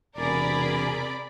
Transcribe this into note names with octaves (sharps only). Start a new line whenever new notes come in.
E1 C3 C4 G#4 A#4 D5 B5